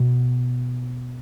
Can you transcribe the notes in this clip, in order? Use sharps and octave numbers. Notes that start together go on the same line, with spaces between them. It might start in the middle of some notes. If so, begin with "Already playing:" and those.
Already playing: B2